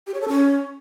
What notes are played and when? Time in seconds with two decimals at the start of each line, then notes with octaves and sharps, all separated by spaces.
0.07 G4
0.14 C#5
0.21 A4
0.28 C#4